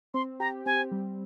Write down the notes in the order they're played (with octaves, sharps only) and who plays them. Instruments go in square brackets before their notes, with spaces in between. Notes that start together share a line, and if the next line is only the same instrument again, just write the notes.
[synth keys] C4 [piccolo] C6
[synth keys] G4 [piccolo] A#5
[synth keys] C4 [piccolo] G#5
[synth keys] G3